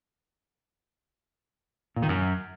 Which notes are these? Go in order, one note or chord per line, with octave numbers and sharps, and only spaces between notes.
A#2
D#3
F#2